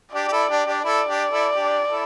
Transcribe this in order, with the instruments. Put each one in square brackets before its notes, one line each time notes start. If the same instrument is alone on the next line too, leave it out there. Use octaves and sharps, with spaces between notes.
[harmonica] D4 G4 [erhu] D5
[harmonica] G4
E4 A4
D4 G4
D4 G4
[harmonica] E4 A4 [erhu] D5
[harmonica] D4 G4
E4 A4
D4 G4
E4 A4